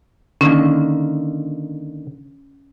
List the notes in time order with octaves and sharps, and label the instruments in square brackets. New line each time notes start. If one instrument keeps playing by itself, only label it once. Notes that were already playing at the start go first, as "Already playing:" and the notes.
[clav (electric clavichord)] D3 D#3 A#3 [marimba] C#4